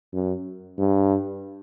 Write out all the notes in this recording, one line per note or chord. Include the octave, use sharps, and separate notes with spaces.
F#2
G2